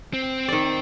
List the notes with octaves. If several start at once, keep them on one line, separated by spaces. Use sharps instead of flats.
C4
D#3 D5